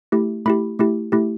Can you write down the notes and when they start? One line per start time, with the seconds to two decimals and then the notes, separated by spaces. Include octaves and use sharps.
0.12 A3 E4 G4
0.46 A3 E4 G4 B5
0.79 A3 E4 G4
1.12 A3 E4 G4